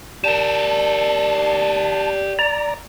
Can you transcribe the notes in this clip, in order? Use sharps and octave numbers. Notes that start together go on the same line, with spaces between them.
G4 A#4 D5 A5
D5 A#5